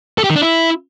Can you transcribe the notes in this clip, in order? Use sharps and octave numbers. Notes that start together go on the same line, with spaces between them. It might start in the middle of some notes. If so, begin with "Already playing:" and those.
A4
G4
D#3
D4
E4